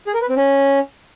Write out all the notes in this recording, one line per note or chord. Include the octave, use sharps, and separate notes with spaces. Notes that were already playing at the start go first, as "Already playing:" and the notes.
G#4
A#4
B4
C4
C#4